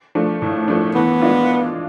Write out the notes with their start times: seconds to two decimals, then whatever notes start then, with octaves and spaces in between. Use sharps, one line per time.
0.15 F3 A3 D4
0.42 A2
0.68 F3 A3 D4
0.94 E3 B3
1.21 G#3 D4 F4